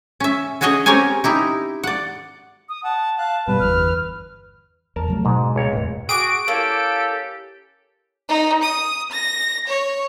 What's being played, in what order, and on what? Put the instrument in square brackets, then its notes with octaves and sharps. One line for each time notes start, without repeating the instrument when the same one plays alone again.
[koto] C#4 E5
C#4 F#4 G#4 C#5 D#5
C4 C#4 G4 A#4 C#5 G#5
D#4 E4 G4
D5 F#5
[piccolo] D#6
[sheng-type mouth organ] F#5 [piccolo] A5
[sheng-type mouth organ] F5 F#6 [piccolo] A5
[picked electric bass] G2 B2 G3 [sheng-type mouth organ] B4
[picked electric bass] G1 E2 [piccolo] F6
[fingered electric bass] E2 [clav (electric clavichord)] A#4 A5
[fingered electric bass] C#3 F#3 A3
[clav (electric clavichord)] G#2 [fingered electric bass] B2 G#3
[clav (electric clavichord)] C#2 C#5
[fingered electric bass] F2 A2
[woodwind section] F#4 [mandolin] G#4 D6 [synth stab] D7
[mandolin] A#3 [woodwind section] C#4 E4 G4 [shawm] A4
[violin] D#4
D#6
A#6
C#5